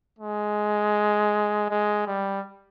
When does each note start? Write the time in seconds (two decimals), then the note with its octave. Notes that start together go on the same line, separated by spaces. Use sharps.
0.19 G#3
1.69 G#3
2.06 G3